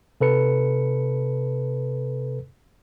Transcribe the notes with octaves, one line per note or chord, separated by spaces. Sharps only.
C3 A4 B4 C#7